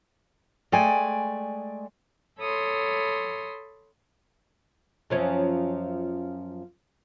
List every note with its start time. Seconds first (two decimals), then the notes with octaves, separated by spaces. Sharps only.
0.72 G#3 A3 D5 G5 G#5
2.40 A4 C#5 B5 C6 D#6
5.10 F#2 F3 C#4